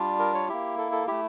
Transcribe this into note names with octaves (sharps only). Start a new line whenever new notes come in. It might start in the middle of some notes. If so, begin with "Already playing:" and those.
Already playing: G3 D4 F4
A#4
C#5
A#3 E4 G4
A4
A4
A3 E4 G4